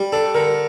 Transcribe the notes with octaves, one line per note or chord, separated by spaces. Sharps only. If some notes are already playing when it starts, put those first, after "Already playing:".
Already playing: G3
D4 A4
D3 A#4